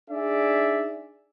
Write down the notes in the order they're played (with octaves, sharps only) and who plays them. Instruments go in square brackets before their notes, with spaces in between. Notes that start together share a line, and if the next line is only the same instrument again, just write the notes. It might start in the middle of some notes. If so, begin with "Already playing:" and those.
[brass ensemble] D4 D#4 G#4 D5 E5